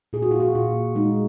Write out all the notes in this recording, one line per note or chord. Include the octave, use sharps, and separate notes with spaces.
A#2 G#4
F#4
F4
F#4
A#2 F4
G#3 D#4